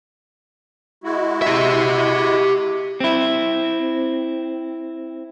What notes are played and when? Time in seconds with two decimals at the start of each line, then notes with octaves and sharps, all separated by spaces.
1.04 G#3 E4 F#4
1.42 G4 E5
3.00 C4 E4